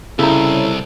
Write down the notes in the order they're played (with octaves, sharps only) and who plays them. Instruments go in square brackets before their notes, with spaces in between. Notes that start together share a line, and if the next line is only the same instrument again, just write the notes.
[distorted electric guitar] C2 [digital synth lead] C#3 [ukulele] E4 A#5 [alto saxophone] A4